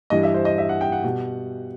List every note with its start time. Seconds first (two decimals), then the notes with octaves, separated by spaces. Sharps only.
0.10 G2 E3 G3 D#5
0.23 E5
0.34 C5
0.45 D#5
0.58 E5
0.69 F#5
0.81 G5
0.92 F#5
1.03 B2 G3